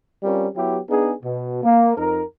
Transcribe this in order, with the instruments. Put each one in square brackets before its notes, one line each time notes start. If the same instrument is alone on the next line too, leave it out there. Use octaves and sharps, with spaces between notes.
[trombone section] G3 C4 C#4 F4 A#4
F#3 B3 E4 G4
B3 D4 D#4 G#4
B2
A#3
F2 D#4 A#4